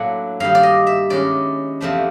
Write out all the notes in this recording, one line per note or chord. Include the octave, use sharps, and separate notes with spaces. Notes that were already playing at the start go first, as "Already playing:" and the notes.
Already playing: A2 F#3 A#3 D4 F#5
G2 D#3 G3 F5
D5
D#5
E5
D#3 G#3 C#4 E4 D5
E2 C3 F3 A3 D4